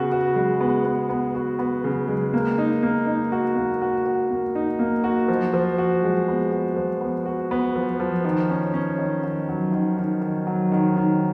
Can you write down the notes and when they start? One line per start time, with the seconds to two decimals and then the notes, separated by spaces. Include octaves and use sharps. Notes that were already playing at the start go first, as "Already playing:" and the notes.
Already playing: C#3 B3 F#4
0.12 F#4
0.36 G#3
0.60 B3
0.85 B3
1.09 B3
1.35 F#4
1.59 B3
1.84 C#3
2.08 G#3
2.34 A#3
2.58 D#4
2.83 A#3
3.07 D#4
3.32 F#4
3.56 A#3
3.82 F#4
4.06 F#4
4.30 A#3
4.55 D#4
4.79 A#3
5.04 F#4
5.28 F3
5.54 F3
5.78 F#4
6.03 G#3
6.28 B3
6.52 F#4
6.76 F3
7.01 B3
7.26 F#4
7.51 B3
7.75 F3
8.00 F3
8.25 D#3
8.50 C#4
8.74 C#4
8.99 D#3
9.24 D#3
9.49 F#3
9.73 D#3
9.98 D#3
10.21 D#3
10.47 F#3
10.72 D#3
10.97 D#3